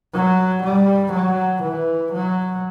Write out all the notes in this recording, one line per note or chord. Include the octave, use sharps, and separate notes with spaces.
F#3
G3
F#3
E3
F#3